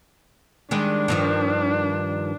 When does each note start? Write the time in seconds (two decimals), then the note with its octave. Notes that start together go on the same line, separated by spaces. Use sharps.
0.71 D#3 G3 G#3 D4
1.08 G2 D#3 F3